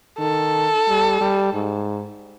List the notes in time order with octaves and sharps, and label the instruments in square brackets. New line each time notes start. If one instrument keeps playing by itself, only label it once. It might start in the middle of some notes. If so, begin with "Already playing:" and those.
[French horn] D#3 [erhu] A4
[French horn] G3
G3
G#2